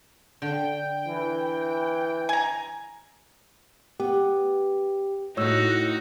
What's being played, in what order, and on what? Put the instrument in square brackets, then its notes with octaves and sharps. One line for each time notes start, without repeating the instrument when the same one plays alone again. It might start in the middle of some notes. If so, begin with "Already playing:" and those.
[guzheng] D3 [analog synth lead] G5
[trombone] E3
[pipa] G#5 A#5
[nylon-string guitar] B3 [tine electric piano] G4
[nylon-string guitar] A2 A3 [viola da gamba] D#4 F#4 [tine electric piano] C#5 E6